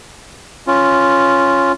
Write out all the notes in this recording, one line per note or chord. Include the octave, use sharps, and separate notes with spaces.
C#4 F4